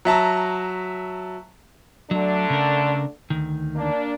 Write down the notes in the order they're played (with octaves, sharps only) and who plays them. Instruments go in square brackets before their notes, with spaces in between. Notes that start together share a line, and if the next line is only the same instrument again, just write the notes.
[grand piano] F#3 E5 A5 A#5
[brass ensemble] D3 A3 D4 [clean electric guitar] F#3
[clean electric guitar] C#3 A#4
D2 D#3
[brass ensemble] A#3 D4